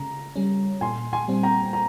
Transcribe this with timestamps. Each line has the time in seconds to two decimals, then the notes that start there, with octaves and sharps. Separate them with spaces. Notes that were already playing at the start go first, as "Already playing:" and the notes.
Already playing: C#3 A#5
0.36 G3 C#4
0.81 A#2 G#5 C6
1.13 G#5 C6
1.28 G3 C4
1.43 G5 A#5
1.73 A#5